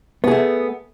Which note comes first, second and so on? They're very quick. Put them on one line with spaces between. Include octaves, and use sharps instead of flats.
B3 G#4 A3